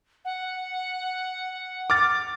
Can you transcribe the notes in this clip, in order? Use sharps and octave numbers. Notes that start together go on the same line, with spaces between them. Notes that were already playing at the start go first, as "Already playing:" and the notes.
F#5
D6 F6 A6